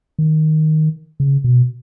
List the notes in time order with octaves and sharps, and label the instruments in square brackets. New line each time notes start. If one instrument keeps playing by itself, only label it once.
[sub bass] D#3
C#3
B2